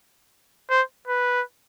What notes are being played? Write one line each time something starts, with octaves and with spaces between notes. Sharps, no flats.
C5
B4